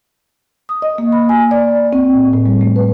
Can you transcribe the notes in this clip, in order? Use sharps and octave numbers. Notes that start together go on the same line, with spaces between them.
D#6
D#5
A#3
B5
G#5
D5
C4
A2
A2
G3
A3
B4